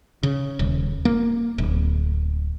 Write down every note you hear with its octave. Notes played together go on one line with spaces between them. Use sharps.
C#3
D#1
A#3
D1